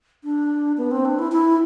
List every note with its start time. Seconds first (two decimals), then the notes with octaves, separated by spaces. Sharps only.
0.24 D4
0.78 B3
0.91 C4
1.05 D4
1.19 E4
1.32 E4